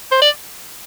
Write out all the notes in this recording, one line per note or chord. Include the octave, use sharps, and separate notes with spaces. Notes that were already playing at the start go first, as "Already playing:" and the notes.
C5
D5